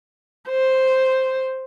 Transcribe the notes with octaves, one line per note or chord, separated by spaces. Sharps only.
C5